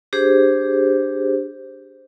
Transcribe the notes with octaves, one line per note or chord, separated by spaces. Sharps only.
D4 G4 G#4 C5